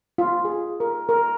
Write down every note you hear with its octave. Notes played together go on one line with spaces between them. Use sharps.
F4
G#4
A#4
A#4